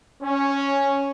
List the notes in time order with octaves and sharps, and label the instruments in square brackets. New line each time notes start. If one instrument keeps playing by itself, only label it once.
[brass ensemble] C#4